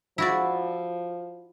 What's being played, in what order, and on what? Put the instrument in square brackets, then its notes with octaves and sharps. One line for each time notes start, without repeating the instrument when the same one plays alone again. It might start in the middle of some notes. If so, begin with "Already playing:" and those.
[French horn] F3 [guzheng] E4 F#4 D5